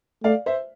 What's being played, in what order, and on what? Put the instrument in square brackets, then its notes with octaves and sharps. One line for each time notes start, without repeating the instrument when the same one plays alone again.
[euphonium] A3 [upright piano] D5 F5
[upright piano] C5 E5